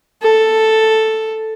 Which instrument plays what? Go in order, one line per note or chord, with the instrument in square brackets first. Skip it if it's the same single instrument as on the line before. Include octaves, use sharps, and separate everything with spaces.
[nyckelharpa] A4